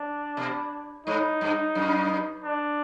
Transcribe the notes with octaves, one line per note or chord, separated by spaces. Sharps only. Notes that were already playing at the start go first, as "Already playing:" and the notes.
Already playing: D4
B2
G#2 D#4
G2
F#2
D4